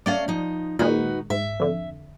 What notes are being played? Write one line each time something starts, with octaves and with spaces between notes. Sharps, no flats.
A3 C#4 D5 F5
F3 D#4
A#2 D#3 G#3 D#4 F#4 B4
G#2 E5
F2 D3